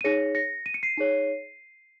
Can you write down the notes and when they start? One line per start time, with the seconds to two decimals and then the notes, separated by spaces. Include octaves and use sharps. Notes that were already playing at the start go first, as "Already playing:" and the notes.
0.01 D#7
0.04 D#4 G#4 C#5 A#6 C#7
0.35 A#6 C#7
0.66 D#7
0.74 C#7
0.83 C7 D#7
0.97 D#4 G#4 C#5